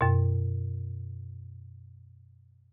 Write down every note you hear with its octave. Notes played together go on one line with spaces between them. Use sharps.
F#2 B2